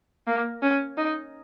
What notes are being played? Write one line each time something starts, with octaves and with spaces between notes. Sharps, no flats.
A#3
C#4
D#4